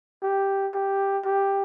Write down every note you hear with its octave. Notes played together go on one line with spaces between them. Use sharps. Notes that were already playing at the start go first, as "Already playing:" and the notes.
G4
G4
G4